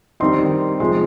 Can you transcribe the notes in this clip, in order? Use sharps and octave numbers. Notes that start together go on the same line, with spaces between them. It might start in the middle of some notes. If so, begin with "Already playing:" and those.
D#3 G3 C4 D#4 C6
C3 F3 G#3 C6